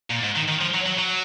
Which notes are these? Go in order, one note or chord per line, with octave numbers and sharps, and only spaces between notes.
A#2
G#2
D#3
D#3
F3
F#3
F#3
F#3